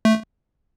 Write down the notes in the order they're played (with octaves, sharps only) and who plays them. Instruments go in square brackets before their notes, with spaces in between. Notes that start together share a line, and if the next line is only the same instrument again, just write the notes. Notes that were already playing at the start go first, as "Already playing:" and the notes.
[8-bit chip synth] A3